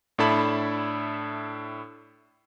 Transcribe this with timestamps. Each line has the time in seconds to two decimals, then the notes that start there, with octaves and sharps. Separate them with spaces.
0.18 A2 D4 E4 A4 A5 B5